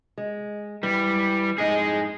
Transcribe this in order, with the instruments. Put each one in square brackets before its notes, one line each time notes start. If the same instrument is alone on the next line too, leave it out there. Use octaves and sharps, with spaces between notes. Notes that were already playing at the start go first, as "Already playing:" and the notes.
[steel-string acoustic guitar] G#3
[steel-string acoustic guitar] E3 [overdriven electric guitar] G3
[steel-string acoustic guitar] F2 G#2 D#4 [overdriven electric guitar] G#4 D#5